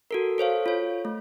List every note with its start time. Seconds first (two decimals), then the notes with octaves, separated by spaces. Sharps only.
0.11 F#4 A4 A#4
0.38 A4 C5 C#5 F5
0.66 F4 C#5
1.05 A3